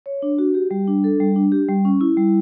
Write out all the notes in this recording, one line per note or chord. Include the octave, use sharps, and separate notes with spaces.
C#5
D4
F#4
G4
G3
D4
A4
G3
D4
G4
G3
C#4
E4
G3